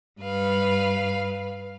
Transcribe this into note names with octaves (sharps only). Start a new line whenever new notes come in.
G2 B4 F5